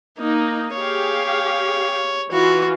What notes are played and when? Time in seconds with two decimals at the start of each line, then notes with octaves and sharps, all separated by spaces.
0.19 A#3 D#4
0.74 G4 G#4 C#5 F5
2.32 E3 F4 F#4